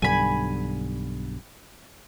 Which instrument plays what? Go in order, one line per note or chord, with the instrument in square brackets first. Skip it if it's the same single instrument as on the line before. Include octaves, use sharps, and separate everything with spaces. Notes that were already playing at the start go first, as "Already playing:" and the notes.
[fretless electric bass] B1 G2 D3 [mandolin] G#5 B5